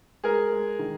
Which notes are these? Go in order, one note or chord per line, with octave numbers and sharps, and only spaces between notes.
G#3 G#4 A#4
G#3
D#3